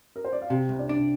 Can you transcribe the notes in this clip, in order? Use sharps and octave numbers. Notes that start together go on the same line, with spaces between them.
A#4
C5
D5
F5
C3 G4 G5
C2
D4 D5
D4